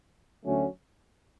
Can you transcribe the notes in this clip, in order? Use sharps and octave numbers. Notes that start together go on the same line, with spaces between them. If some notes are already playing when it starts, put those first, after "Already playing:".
D2 D3 F#3 A3 C#4